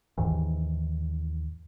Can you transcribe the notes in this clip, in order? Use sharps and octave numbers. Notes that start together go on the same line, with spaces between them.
D#2 G#2 D#3 E3